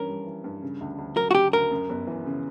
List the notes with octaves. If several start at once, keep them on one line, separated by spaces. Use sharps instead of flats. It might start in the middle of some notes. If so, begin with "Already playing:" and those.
Already playing: G2 E3 C#4 A#4
G3
E3
G2
C#3
D2
D2
F#3 A#4
F#4
C#3 G4
D2 A#4
F#2
G1
E3
C#3